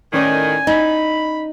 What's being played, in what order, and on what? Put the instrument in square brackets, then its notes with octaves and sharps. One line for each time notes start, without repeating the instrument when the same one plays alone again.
[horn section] A2 D#3 [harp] C#4 B4 D5 [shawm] G#5
[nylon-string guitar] D#4 [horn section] B5